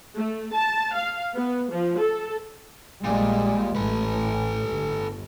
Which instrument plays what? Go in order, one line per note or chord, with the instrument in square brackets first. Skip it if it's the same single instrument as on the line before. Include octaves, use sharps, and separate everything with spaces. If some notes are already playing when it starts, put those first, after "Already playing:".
[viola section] A3
A5
F5
B3
F3
A4
[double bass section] A#1 G3 G#3 [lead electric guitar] A#2
[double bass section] A1 A2 [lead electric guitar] A4 B4
[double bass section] G1